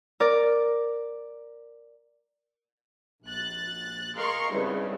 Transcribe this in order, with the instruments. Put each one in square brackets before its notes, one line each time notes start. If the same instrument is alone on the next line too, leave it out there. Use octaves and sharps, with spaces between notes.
[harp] A#4 D5
[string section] A#1 F#6 A6
G#4 A#4 D#5 F5 C6 C#6
G#1 G2 C#3 E4 B4